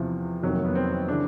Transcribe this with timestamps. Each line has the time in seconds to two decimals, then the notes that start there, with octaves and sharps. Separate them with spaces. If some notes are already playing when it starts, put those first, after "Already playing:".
Already playing: E2 C3 E3 F3
0.43 F2 C3 D#3 F#3
0.54 A#3
0.65 B3
0.75 C4
1.08 C#3 E3 D4